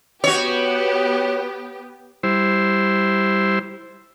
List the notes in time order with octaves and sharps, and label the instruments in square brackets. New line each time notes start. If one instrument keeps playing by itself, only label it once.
[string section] B3 G4 [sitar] F#4 C#5
[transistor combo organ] G3 E4 C5